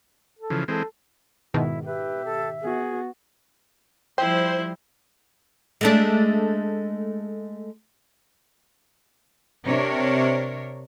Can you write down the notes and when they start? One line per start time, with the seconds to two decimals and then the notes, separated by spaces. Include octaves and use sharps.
0.39 A4
0.50 C#3 E3 F3
0.68 E3 G#3 C4 A4
1.54 G#2 B2 D#3 E4
1.86 G4 B4 E5
2.25 A4
2.61 B3 F#4 G#4
4.18 F3 G3 E4 C5 G5
5.81 G#3 A3 D4
9.66 C3 D4 A#4 C#5